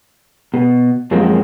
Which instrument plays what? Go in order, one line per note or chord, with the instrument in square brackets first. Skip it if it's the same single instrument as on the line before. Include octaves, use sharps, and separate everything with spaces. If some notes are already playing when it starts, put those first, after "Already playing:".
[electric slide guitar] B2
F#2 F3 G#3 A#3 C4 F#4